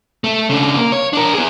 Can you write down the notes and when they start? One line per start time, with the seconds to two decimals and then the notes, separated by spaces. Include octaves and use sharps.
0.24 A3
0.49 C#3 D4
0.77 A#3
0.92 C#5
1.13 D4 A#4
1.34 B3 G#4